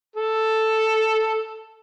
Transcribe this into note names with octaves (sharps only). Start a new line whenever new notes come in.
A4